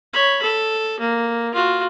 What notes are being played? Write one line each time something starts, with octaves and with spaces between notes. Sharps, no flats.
C#5 B5
A4
A#3
F4 F#4